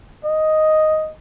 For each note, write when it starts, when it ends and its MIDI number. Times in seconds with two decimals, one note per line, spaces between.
0.25 1.12 75